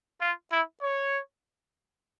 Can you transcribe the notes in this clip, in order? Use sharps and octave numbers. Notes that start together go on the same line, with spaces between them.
F4
E4
C#5